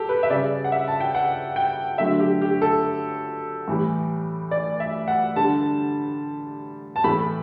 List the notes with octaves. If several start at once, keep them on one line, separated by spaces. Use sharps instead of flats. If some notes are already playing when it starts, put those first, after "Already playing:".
Already playing: G4 A4
B4
E5
C#3 G3 D5
F#5
E5
A5
G5
F#5
G5
D3 F#3 A3 E5
G4
G4
A4
A2 E3 G3
D5
E5
F#5
D3 G3 A5
A5
A2 E3 A3 B5